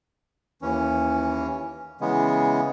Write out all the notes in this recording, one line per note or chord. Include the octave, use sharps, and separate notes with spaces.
D#2 E3 C#4
C#3 E3 G#3 B3